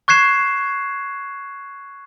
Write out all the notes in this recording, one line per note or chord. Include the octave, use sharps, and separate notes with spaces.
C#6 F#6 G#6 C7 E7